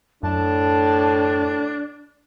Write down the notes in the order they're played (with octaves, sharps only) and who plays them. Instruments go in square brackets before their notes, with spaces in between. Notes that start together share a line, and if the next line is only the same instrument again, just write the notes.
[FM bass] F#2 [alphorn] A2 [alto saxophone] D4 [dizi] A5